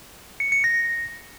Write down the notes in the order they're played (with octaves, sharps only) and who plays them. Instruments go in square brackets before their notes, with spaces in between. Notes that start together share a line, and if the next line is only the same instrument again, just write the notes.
[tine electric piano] C#7
C#7
A#6